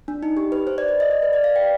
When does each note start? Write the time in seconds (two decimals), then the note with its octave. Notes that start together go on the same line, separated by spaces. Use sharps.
0.08 D4
0.23 D#4
0.37 G4
0.52 B4
0.67 C5
0.78 D5
0.88 D5
1.00 D#5
1.11 D5
1.22 B4
1.33 D5
1.44 F5
1.56 G5